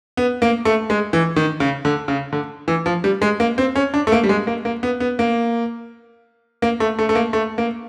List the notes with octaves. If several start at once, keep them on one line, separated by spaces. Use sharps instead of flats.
B3
A#3
A3
G#3
E3
D#3
C#3
D3
C#3
D3
E3
F3
G3
G#3
A#3
C4
C#4
D4
A3
A#3
G3
G#3
A#3
A#3
B3
B3
A#3
A#3
A3
A3
A3
A#3
A3
A#3